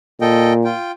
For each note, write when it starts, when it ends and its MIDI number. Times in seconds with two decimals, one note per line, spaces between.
0.21 0.73 46
0.21 0.53 69
0.21 0.53 75
0.21 0.53 79
0.64 0.92 65
0.64 0.92 79